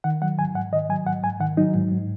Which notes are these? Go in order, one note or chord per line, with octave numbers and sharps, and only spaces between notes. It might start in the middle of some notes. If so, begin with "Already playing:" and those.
D#3 F#5
F#3 F#5
G#2 G#5
G#2 F#5
D#3 D#5
F#3 G#5
G#2 F#5
G#2 G#5
D#3 F#5
F#3 D#4
G#2
G#2